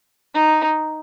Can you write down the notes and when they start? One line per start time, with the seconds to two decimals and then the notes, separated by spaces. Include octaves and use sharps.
0.34 D#4